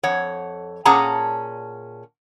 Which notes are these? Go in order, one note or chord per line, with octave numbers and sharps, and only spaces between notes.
F2 C#5 F#5
A#2 C#4 G#4 F#5 A5 A#5